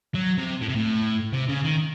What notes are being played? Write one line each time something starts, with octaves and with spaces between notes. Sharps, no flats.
F#3
C3
A2
C3
A2
C3
C#3
D#3